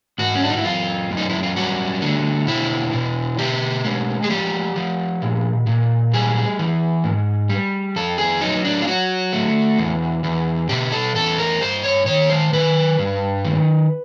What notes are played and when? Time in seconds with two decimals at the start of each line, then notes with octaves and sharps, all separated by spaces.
0.18 G#2 F#4
0.35 C#4
0.43 D4
0.50 D#4
0.57 E4
0.65 F#2 F4
1.11 F#2
1.17 D#4
1.29 E4
1.43 F4
1.56 G3 F#4
2.02 D3
2.47 B2 E4
2.93 B2
3.38 B2 G4
3.85 G#3
4.24 G#4
4.30 F3 G4
4.76 F3
5.22 A#2
5.67 A#2
6.13 G3 G#4
6.59 E3
7.04 G#2
7.49 G3
7.96 F2 A4
8.18 G#4
8.41 F#3 D#4
8.65 D4
8.82 F4
8.87 F#3 F#4
9.32 A3
9.79 E2
10.24 E2
10.69 B2 G4
10.92 A4
11.16 E2 A4
11.38 A#4
11.61 G2 C5
11.83 C#5
12.07 D#3 C#5
12.30 C5
12.53 D#3 B4
12.99 G2
13.45 D#3